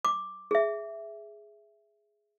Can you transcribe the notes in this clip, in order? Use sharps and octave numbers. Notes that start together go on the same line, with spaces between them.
D6
G#4 E5